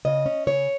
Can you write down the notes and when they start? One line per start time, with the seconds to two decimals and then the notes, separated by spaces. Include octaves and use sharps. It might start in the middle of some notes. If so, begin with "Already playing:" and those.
0.05 C#3 D#5
0.26 C#4
0.47 C#3 C#5